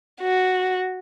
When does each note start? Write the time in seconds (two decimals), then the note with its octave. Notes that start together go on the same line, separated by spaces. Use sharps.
0.21 F#4